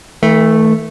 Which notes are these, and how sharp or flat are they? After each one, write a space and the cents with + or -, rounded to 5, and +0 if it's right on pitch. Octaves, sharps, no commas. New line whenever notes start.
E3 -45 A3 +0